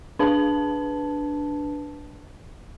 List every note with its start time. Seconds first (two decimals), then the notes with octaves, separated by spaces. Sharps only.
0.19 D4 B4 A5